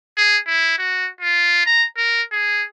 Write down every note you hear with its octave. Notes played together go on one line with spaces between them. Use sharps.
G#4
E4
F#4
F4
A#5
A#4
G#4